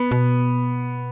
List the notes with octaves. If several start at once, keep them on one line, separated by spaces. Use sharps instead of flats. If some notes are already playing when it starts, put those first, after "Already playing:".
Already playing: B3
B2